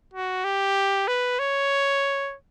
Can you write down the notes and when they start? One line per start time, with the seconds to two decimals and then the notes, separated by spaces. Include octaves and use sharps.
0.14 F#4
0.44 G4
1.08 B4
1.39 C#5